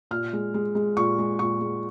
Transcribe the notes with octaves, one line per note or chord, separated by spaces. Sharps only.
A#2 F6
G#3
G#3
G#3
A#2 C#6
G#3
A#2 C#6
G#3